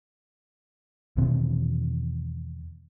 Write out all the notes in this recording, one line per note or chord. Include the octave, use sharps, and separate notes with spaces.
E2 B2 D#3 C4